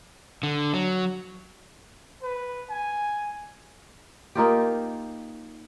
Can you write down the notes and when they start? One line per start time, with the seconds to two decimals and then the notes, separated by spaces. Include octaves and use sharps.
0.43 D3
0.74 F#3
2.22 B4
2.69 G#5
4.35 A#3 D#4 F4 G4